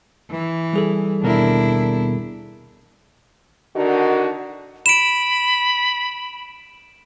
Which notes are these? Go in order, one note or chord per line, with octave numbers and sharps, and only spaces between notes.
E3
G3 G#4 A4
D#2 B2 D4 E4 A#4
D3 D#3 D4 D#4 F#4
B5 D7 E7